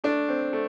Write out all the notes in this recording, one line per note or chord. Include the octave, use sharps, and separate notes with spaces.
A3 D4
C4
A3